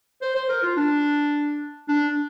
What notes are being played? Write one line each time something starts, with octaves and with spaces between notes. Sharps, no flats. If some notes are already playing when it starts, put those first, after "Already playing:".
C5
C5
A#4
F4
D4
D4